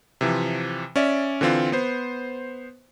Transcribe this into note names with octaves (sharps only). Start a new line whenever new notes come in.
C3 E3 F3
C#4 D5 E5
D3 E3 C4 F4
B3 C5